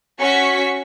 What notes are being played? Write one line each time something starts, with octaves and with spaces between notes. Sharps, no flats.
C#4 F#4 C#6 B6